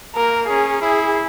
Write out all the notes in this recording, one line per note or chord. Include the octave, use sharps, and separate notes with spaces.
A#3 A#4
C#4 G#4
E4 G#4